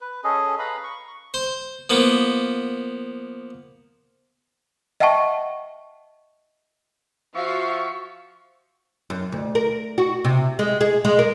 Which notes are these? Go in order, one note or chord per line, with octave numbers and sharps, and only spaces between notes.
B4
C#4 G#4 A4 D#5
B4 F5 A#5 B5
C#6
C5
F3 A#3 B3
D#5 E5 F#5 G5 A5 C#6
F3 F4 F#4 E5 F5 C#6
F#2
D2
A#4
F#4
C3
G#3
G#4
G#3
A#4